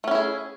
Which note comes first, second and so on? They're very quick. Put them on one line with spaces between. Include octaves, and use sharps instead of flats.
A3 C#4 E4 G#4